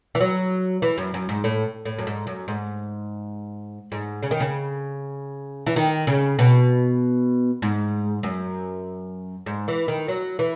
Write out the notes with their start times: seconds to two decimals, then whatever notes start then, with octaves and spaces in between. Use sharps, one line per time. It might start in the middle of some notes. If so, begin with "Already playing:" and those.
0.15 E3
0.20 F#3
0.82 E3
0.98 F#2
1.14 F#2
1.29 G#2
1.44 A2
1.85 A2
1.99 F#2
2.07 G#2
2.27 F#2
2.48 G#2
3.92 G#2
4.23 C#3
4.31 D#3
4.40 C#3
5.66 E3
5.76 D#3
6.07 C#3
6.39 B2
7.62 G#2
8.23 F#2
9.46 G#2
9.68 E3
9.88 D#3
10.08 F#3
10.39 E3